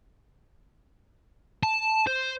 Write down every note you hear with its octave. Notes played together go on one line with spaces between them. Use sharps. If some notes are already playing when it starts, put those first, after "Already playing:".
A5
C5